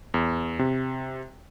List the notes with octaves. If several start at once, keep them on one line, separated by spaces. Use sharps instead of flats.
E2
C3